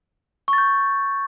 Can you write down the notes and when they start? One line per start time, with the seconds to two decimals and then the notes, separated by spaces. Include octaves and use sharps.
0.48 C#6
0.53 A6
0.58 G6